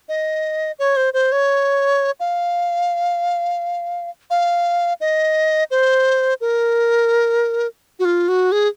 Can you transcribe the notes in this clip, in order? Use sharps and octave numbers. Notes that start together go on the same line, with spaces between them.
D#5
C#5
C5
C5
C#5
F5
F5
D#5
C5
A#4
F#4
F4
F#4
G#4